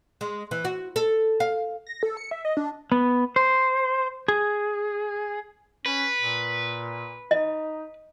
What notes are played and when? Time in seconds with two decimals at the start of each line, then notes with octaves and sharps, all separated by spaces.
0.21 G#3
0.51 E3
0.65 F#4
0.96 A4
1.40 F5
1.87 A#6
2.03 A4
2.17 C#7
2.31 E5
2.45 D#5
2.57 D4
2.92 B3
3.36 C5
4.28 G#4
5.86 C#4 B4
6.19 A#2
7.31 D#4 D#5